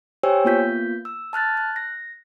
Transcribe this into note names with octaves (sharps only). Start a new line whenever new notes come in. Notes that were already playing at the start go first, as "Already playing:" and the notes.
G4 C5 C#5 G5 G#5 E6
A#3 B3 F4 G6 B6
E6
A5 F6 F#6 A6
F#6
A#6